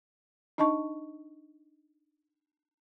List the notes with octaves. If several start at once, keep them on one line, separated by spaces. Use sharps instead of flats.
D4 D#4 D#5 A5 C#6